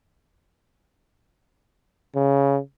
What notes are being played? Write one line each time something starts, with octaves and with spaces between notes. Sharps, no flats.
C#3